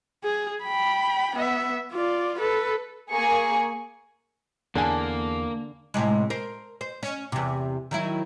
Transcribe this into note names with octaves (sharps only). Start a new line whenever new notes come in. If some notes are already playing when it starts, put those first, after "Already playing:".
G#4
G5 B5
B3 E5
F4 D5
A4 B4
A#3 G#4 G#5 C#6
E2 D3 A#3 G#4 G#5 A5
A2 C3 G#3
A#4 C5
C5
C#4
E2 C3
D#3 F#3 E4